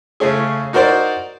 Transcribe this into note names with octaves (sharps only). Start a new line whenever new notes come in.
C#3 A3 C#4 G#4
D#4 F#4 A#4 C5 D5